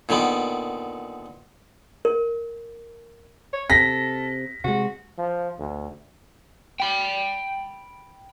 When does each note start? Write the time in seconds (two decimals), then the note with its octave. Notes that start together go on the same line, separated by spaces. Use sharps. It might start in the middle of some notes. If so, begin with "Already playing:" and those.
0.09 A#2 D3 D#3 B3
2.05 A#4
3.53 C#5
3.70 C3 A4 A#6 B6
4.64 C3 G#3 F#4
5.18 F3
5.59 D2
6.80 G5 B5